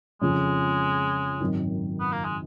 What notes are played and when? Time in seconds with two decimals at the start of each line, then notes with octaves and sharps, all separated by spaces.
0.21 F2 C#3 F3 G#3
1.40 G#1 F#2 D#3
2.00 B3
2.12 A#3
2.25 G#3